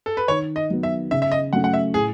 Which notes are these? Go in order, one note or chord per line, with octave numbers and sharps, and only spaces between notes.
A4
B4
D#3 C#5
D#5
F#3 B3
E5
C#3 E5
E5
D#5
F#3 A3 C#4 F#5
F#5
E5
A2 G#4